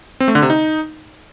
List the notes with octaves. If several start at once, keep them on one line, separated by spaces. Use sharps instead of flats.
C4
A3
D3
C3
D#4